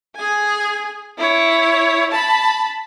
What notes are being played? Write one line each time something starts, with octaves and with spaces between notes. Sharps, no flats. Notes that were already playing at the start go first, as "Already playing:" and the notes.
G#4 G#5
E4 C#5
A5 B5